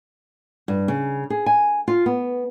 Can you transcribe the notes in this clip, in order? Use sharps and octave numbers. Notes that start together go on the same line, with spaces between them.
G2
C#3
G#4
G#5
F4
B3